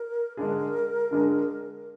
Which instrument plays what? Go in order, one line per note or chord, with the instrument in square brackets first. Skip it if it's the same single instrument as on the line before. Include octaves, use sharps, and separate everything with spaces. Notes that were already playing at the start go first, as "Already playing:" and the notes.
Already playing: [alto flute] A#4
[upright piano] D3 G#3 D4 G#4 [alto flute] A#4
[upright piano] D3 G#3 D4 G#4